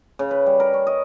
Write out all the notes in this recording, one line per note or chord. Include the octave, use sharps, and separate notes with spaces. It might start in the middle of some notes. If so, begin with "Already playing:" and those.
C#3
B4
G3
A#4
C#4
D#5